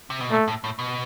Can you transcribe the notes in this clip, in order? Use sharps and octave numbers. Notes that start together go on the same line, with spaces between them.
C3
B2
A#2 A3
A2
A2
B2